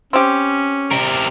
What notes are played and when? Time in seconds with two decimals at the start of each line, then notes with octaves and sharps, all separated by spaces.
0.13 C4 C#4 G4
0.91 C3 A#4